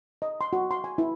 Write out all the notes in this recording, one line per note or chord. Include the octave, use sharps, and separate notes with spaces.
D#5
C6
F#4
C6
G#5
E4